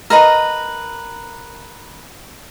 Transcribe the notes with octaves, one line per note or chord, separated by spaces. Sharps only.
A#4 B4 D#5 A#5